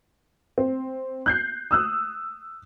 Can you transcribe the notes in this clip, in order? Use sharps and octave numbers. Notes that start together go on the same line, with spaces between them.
C4
F#6 G6 C7
D#6 E6 F#6